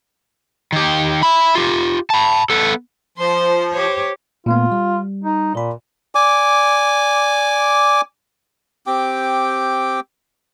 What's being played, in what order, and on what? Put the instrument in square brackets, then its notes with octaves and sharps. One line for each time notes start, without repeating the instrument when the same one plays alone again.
[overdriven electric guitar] D#3 G4
E5 B5
F4 G4
A5 B5
B3 A4
[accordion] F3 [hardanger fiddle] C5 C6
[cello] G4 C#5 [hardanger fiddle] C5
[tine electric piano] A#2 A3 B3 [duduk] F4
[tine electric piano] G3
[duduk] D#4
[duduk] A#2 [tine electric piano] A#4 B5
[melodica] D5 G#5 D6
C4 G4 G5 D6